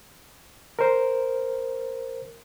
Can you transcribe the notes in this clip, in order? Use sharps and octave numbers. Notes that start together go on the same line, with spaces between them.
A#4 C5